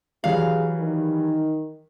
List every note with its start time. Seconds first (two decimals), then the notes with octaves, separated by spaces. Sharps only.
0.24 E3 F#3 G3 G#4 F5
0.79 D#3